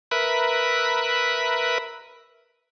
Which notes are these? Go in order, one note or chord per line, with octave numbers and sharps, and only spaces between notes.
A#4 B4 E5 B5 F#6